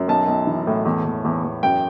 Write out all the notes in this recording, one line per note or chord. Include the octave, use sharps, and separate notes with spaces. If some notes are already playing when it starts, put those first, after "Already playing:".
Already playing: F#2
B1 A5
B1
E3
A2
E2
E2
E2
E2
F#2 G5